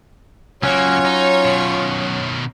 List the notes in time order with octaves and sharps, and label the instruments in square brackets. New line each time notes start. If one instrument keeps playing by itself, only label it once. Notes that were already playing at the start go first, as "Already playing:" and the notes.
[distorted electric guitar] C#2 A#3 [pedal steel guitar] F#3 C#4 [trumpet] F4 [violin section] C#5
[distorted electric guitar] D#4
B2 D#3